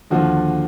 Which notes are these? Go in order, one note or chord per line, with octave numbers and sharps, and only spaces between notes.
D#2 D3 F3 F#4